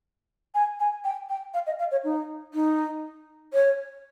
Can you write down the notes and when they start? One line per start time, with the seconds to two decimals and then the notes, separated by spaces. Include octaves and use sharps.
0.55 G#5
0.80 G#5
1.04 G5
1.29 G5
1.54 F5
1.67 D#5
1.79 F5
1.91 C#5
2.04 D#4
2.54 D#4
3.53 C#5